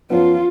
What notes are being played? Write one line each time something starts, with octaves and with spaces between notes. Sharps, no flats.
F#2 F3 B3 F4